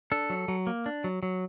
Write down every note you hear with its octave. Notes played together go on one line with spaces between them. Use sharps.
D4 A4
F#3
F#3
A#3
D4
F#3
F#3